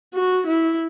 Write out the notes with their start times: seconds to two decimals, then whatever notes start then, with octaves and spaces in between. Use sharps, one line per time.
0.14 F#4
0.46 E4